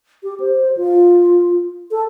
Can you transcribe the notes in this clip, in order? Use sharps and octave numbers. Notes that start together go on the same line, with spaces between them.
G4
C5
F4
A4